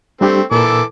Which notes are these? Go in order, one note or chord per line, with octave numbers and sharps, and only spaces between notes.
G3 A3 C4 D4 G4
A#2 E3 A4 A#4 D6